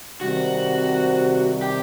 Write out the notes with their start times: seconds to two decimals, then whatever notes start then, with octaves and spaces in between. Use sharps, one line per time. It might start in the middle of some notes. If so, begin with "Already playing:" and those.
0.21 C3 D#3 G3 C4 F#4
1.62 G4